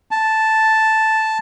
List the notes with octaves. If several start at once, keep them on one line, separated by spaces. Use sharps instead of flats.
A5